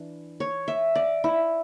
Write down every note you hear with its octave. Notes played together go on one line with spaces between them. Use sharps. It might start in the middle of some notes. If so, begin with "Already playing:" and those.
Already playing: E3 D4
C#5
E5
D5
E4